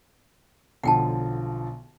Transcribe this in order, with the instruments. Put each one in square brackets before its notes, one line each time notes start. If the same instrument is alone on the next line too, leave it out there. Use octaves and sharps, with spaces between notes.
[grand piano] B1 D3 F3 [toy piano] F#5 G5 A5